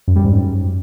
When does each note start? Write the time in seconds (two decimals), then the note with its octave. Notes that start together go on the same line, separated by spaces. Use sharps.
0.08 F#2
0.16 G3
0.24 G#2
0.32 F#2